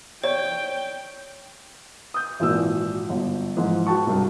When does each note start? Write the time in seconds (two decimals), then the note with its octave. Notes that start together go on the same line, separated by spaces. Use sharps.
0.23 C#5 D5 G5
2.14 D#6 G6
2.40 G#1 A#2 E3 F#4 B4 E6
3.09 G1
3.57 G#2 E3 F3
3.87 F#4 G5 A5 C#6
4.06 C2 G2